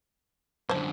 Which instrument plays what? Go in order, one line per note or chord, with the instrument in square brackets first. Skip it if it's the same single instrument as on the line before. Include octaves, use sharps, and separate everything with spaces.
[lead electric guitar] F#2 D3 [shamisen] C5 A5